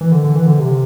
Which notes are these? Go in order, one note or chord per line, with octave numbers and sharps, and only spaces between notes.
E3
D3
D3
E3
D3
C3